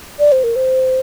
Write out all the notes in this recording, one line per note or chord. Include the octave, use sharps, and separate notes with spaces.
D5
C5
A#4
C5